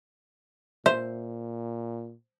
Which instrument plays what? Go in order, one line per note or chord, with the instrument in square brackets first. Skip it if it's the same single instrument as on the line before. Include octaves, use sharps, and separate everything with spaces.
[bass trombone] A#2 [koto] C5 [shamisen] E5